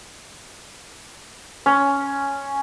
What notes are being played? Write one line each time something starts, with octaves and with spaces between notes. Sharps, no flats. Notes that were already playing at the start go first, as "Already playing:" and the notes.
C#4